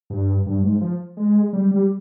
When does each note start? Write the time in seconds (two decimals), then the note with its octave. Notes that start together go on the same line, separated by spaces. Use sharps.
0.10 G2
0.46 G2
0.64 G#2
0.81 F3
1.17 G#3
1.53 G3
1.71 G3